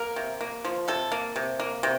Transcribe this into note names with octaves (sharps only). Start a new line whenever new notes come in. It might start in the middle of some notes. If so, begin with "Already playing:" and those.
Already playing: A#3 A#4
C3
A#3
F3
C3 A4
A#3
C3
A#3
C3